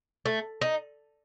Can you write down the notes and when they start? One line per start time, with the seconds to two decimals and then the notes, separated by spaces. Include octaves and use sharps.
0.26 A3
0.61 D#4